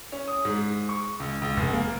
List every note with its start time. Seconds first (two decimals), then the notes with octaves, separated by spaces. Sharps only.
0.12 C#4
0.28 D#6
0.45 G#2
0.89 C#6
1.20 C#2
1.42 C#2
1.57 F1
1.73 A#3